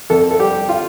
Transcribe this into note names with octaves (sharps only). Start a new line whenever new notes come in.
F2 A4
A4
G3 G4
F4